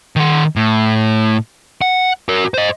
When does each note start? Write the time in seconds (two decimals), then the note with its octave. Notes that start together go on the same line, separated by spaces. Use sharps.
0.16 D#3 F#5
0.56 A2
1.82 F#5
2.29 F#4 A#4
2.54 C5 D#5